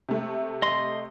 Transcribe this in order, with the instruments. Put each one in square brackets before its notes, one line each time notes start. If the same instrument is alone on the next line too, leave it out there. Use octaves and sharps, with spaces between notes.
[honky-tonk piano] C3 A3
[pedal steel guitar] D#5 C6